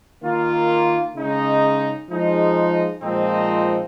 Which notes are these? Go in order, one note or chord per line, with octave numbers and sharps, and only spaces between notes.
D#3 A#3 F4
C#3 G#3 D#4
F3 G#3 D#4 G#4
A#2 F3 G#3 C4 D#4